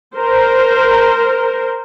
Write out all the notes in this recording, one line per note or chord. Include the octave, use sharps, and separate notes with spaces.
A#4 C5